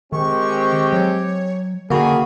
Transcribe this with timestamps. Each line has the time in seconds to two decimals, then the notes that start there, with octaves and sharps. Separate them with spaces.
0.12 D#3 G#3 C4 G4 C#6
0.93 F#3 C#5
1.90 F#2 D3 D#3 A#3 F#4 G#4 B5